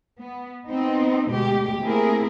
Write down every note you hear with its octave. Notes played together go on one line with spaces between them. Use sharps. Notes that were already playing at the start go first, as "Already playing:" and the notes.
B3
B3 C4 D#4
D2 B2 G#3 G4
A3 A#3 C4 E4 G#4 A#4